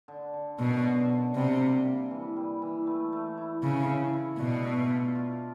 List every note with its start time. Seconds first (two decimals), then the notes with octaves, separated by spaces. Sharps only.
0.08 D3
0.34 D3
0.58 F#2 B2
0.84 D3
1.09 D3
1.35 C3 G3
1.60 A#3
1.85 A#3
2.11 E3
2.36 G3
2.62 E3
2.87 A3
3.13 A3
3.38 E4
3.63 C#3 E4
3.89 E4
4.14 E4
4.39 B2 D4
4.64 A3
4.90 F4
5.15 F4